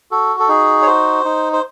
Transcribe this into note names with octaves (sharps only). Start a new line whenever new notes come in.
F#4 A4
A4
D#4 G#4
C#5
F#4 C5
D#4
C5